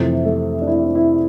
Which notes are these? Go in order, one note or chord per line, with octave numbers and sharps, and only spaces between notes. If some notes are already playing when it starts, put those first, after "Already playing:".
Already playing: F2 C3 E3 A3
A3
D4
E4
D4
E4